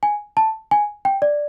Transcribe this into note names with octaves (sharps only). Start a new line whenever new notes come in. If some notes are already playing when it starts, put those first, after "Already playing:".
G#5
A5
G#5
G5
D5